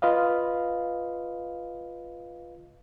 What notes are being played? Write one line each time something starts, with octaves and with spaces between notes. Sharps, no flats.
F4 B4 D#5 F5